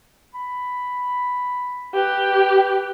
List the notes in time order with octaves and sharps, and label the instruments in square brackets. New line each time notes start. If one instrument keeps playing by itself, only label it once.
[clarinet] B5
[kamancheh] G4 [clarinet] B4